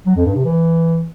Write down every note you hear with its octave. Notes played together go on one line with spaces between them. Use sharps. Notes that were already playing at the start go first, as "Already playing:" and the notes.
F#3
F2
G2
C3
E3